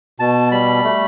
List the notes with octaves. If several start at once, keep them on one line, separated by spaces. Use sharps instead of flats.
B2 A5
G3 B5
A3